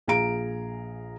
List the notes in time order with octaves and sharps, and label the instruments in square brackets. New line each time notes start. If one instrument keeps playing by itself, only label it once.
[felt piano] A#1 G#4 F5 A#5 D7